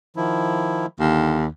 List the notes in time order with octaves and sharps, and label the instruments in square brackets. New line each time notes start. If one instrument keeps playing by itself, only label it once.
[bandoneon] D#3 F3 E4
[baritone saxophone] D#2 [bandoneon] D3